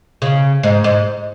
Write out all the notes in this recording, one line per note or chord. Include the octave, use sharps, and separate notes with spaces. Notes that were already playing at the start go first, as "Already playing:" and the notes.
C#3
G#2
G#2